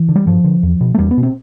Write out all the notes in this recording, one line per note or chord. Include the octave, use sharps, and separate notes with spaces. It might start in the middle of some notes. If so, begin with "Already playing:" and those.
Already playing: E3
D3
G3
G2 F3
D3
E2
B2
A3
E2 G3
B3
B2
C4